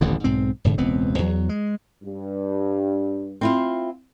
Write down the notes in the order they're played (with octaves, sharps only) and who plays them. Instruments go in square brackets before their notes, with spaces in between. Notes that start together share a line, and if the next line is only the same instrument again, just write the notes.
[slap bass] D#1 A1 E2 D3
B1 G#2 C4
F1 G#2 D3
E1 C#2 B3 C4
E2 F#3
G#3
[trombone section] G2
[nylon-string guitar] C4 E4 F4